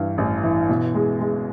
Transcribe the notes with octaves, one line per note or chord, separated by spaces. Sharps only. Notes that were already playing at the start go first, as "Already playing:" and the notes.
Already playing: G2 E3
A1
E3
B2
G#3
G#3